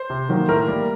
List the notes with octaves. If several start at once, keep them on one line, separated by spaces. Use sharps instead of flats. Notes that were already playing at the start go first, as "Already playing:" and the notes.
Already playing: C5
C3
D#3 F#3 A#3
A2 A#4
G3 A#3